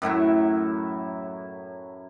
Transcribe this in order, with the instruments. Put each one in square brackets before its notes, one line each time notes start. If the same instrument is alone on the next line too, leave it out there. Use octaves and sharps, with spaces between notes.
[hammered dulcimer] F#2 A2 F#3 E4